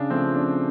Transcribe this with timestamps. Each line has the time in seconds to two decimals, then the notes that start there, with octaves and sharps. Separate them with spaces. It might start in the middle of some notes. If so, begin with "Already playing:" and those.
Already playing: C#3 D4
0.10 F3 A3 C4
0.34 D4